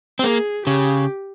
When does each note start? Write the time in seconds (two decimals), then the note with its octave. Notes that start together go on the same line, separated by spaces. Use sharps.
0.19 C4
0.24 A#3 G#4
0.66 C#3 G4